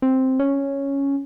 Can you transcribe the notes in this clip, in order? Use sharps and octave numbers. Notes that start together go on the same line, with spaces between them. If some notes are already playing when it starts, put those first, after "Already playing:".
C4
C#4